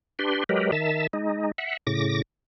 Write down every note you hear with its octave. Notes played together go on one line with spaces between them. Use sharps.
D4 G4 B4 C6
F#3 G#3 G4 A#4 B4
D#3 E5 A5
G#3 D#4
E5 F#5
A2 C#3 D6 A#6